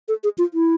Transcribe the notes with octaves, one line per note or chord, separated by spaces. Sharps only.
A4
G#4
F4
E4